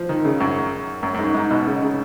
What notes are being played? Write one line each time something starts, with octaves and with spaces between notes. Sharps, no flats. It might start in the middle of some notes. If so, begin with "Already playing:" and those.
Already playing: F3
D#3
C#3
F#2
F#2
F#2
G#2
G#2
B2
C#3
C#3